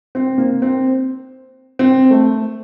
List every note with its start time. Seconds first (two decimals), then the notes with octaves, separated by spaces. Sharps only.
0.15 C4
0.38 A#3
0.62 C4
1.79 C4
2.11 A3